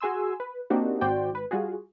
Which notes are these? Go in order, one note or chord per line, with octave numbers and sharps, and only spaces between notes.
F#4 G#4 G#5 C6 E6
B4
A#3 C4 D4 D#4 F#4 G4
G#1 F#4 C5 D5 G5
G#1 B4
G3 F4 F#4 G#4